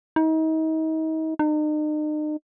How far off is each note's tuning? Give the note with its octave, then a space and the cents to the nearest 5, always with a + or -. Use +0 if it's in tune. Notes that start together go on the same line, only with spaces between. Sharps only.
D#4 +35
D#4 -40